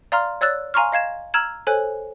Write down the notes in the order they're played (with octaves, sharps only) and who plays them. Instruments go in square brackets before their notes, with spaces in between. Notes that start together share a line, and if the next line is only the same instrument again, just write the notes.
[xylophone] D5 F5 A#5 C6 F6
C#5 D5 E6 F#6 A6
F5 G#5 A#5 C6 C#6 F6
D#5 F5 G#6 E7
A#5 E6 F6 G#6 E7 F#7
A4 C5 C#5 G#5 F#6